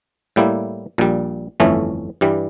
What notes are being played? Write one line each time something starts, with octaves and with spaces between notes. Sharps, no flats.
A2 G3 A#3 E4
A#1 A#2 G3
G1 F2 E3 A3 C#4
G2 E3 G3